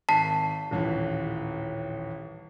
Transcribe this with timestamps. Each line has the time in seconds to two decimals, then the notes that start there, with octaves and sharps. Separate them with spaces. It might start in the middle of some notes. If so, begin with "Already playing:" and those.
0.09 G#1 A5 B6 C7
0.71 D#1 A1 E3